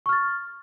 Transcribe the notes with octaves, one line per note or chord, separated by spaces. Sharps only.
C#6 F6 A6